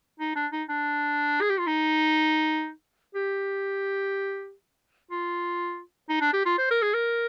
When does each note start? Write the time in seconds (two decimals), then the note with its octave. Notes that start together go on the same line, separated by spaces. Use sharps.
0.20 D#4
0.36 D4
0.52 D#4
0.69 D4
1.41 G#4
1.50 G4
1.58 F4
1.67 D#4
3.15 G4
5.11 F4
6.09 D#4
6.21 D4
6.33 G4
6.46 F4
6.58 C5
6.71 A#4
6.82 G#4
6.94 A#4